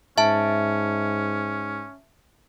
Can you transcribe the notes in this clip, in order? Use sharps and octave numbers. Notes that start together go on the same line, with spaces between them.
G#2 C#4 E5 A5